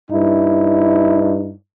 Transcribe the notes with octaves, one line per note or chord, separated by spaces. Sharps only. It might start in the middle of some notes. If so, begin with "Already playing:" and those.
G2 D#4 E4